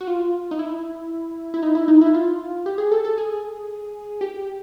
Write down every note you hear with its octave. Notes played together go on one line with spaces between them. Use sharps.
F#4
F4
D#4
E4
E4
D#4
E4
D#4
E4
F4
G4
G#4
A4
A4
G#4
G4